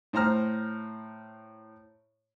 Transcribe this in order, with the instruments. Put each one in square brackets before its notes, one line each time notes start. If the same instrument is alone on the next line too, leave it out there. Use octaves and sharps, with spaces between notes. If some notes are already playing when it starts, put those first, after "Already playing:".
[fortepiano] A2 C5 A#5 F6